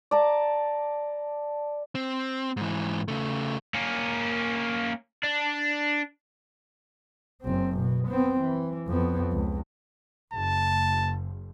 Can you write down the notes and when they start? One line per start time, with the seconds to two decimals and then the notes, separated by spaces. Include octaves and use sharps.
0.11 D5 A5 A#5
1.95 C4
2.57 G#2 E3
3.08 C#3 A3
3.74 A#3 C#4
5.23 D4
7.43 F#1 C4
7.78 B2
8.09 B3 C4
8.41 E3
8.88 F2 B3
9.32 C#2
10.33 F#1 A5